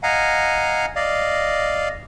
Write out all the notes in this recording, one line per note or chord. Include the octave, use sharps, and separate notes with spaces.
D#5 F5 F#5 G#5 A#5
D5 D#5 F5